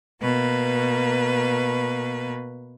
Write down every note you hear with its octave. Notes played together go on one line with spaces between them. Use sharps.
B2 A#3 B4